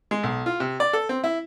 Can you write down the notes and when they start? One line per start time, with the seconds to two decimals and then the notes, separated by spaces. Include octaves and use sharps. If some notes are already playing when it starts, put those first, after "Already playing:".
0.11 G#3
0.23 B1
0.46 F4
0.60 C3
0.80 D5
0.93 A4
1.09 C4
1.24 E4